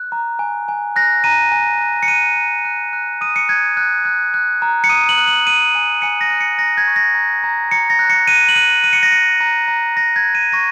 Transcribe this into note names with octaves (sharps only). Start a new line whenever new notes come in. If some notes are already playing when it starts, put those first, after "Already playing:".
Already playing: F#6
A#5
G#5
G#5
F#6 A#6
A#5 D#7
G#5
F#6
C#7
F#6 D#7
A#5
F#6
F#6
D#6 D#7
C#7
F#6 G#6
F#6
F#6
F#6
A#5
C#7
D#6 D#7
F#7
F#6
F#7
D#6 D#7
G#5
G#5 C#7
A#6
F#6
C#7
A#5 A#6
G#6
C#6
A#6
A#5
A#5
A#5 C#7
A#6
F#6
C#7
F#6 D#7
F#7
F#6 D#7
F#6 D#7
C#7
A#6
F#6 C#7
A#5
A#5
A#5 A#6
G#6
F#6
D#7
C#6 A#6